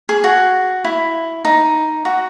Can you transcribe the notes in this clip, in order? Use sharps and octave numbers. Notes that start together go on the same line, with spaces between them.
G#4
F#4
E4
D#4
F#4